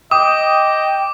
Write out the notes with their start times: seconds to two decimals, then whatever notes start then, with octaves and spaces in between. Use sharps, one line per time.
0.11 D#5 G5 D6 D#6